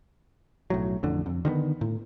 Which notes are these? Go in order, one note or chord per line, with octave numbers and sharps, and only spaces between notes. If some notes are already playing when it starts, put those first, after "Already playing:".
B1 A2 F#3
A1 F2 D3
F2
D3 D#3 A#3 B3
A2